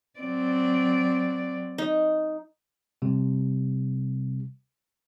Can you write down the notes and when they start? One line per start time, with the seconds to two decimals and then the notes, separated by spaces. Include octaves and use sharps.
0.20 F#3 C4 D5
1.78 D#4
3.02 C3 G3